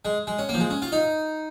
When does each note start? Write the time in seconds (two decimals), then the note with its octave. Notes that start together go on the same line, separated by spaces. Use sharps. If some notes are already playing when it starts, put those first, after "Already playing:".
0.05 G#3
0.27 G#3
0.39 C#4
0.49 F3 A#3
0.60 G#3
0.70 C#4
0.82 F4
0.92 D#4